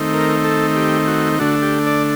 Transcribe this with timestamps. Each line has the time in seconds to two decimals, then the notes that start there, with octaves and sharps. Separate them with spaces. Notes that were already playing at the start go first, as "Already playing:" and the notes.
Already playing: D#3 A3 C4 D#4
0.14 A#4
0.45 A4
0.76 G4
1.07 F#4
1.39 D3 A3 D4 F#4
1.62 G4
1.87 D5